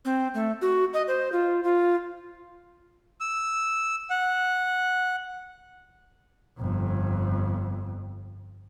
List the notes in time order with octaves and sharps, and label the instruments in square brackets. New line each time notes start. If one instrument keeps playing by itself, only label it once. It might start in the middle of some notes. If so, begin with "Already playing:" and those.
[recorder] C4
A3
F#4
D#5
C5
F4
F4
[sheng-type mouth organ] E6
F#5
[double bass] G1 F2